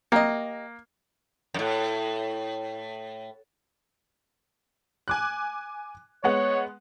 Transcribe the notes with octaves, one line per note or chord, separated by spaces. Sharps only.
A#3 G4 D#5
F#2 A2
G#5 D6 F#6
G#3 B3 C#5 F#5